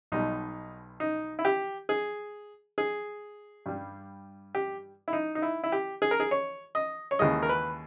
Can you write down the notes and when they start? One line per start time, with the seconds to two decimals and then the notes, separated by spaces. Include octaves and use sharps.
0.12 B1 B2 G3 D#4
1.00 D#4
1.39 E4
1.45 G4
1.89 G#4
2.78 G#4
3.66 G2 G3
4.55 G4
5.08 E4
5.13 D#4
5.35 D#4
5.42 E4
5.64 E4
5.72 G4
6.02 G#4
6.11 A#4
6.20 G#4
6.31 C#5
6.75 D#5
7.11 C#5
7.19 D#2 C#3 E3 G#3 D#5
7.43 A#4
7.49 B4